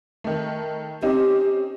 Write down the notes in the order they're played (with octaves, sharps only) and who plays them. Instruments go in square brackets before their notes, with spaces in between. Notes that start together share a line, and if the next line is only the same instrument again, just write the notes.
[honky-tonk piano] D#3 A3
[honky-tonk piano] C4 C#4 D#4 [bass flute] G4